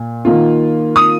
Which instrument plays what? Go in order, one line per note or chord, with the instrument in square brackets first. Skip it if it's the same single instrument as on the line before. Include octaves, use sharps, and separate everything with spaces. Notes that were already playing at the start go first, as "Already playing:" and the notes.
Already playing: [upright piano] A#2
D#3 A#3 F4
D#6